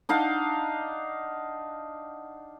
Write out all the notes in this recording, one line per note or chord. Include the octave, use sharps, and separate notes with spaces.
D4 D#4 F5 F#5